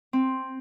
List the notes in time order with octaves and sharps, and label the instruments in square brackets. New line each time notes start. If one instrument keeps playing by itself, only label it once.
[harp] C4